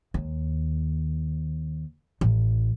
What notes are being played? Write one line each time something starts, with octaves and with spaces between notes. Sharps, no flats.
D#2
A1